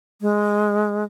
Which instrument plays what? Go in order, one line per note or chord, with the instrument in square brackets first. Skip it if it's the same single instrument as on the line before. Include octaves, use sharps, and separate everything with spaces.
[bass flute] G#3